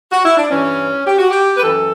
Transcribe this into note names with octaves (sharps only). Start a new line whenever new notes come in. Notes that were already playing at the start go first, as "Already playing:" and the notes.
F#4
E4
D4
G2 E3 C#4
G4
F#4
G4
B4
F#2 E3 A4